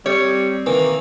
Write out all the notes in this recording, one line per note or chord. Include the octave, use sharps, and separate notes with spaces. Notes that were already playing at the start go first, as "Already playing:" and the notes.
G3 C4 C#5
D#3 E3 A#3